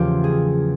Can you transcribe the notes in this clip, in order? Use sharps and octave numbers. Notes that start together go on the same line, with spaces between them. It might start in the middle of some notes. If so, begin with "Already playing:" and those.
Already playing: E2 C#3 F3 A3 F4 G4
G#4